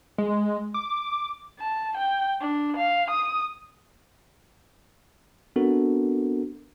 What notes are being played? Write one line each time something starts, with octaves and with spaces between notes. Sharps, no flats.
G#3
D6
A5
G5
D4
F5
D#6
B3 C4 D4 F#4 A4 A#4